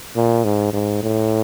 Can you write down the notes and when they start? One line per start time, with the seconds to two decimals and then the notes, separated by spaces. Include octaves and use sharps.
0.16 A#2
0.44 G#2
0.73 G#2
1.03 A2